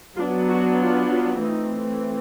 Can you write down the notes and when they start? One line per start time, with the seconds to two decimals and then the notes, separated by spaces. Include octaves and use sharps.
0.16 F#3 B3 D4 F4
0.48 F#4
0.80 F4
1.10 F4
1.42 E3 A3 C4 D#4